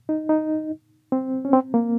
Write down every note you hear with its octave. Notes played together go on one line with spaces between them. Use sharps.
D#4
D#4
C4
C#4
C4
A#3